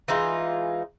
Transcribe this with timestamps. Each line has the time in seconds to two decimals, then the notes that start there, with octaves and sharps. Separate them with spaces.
0.08 E3 G#3 D#4 F4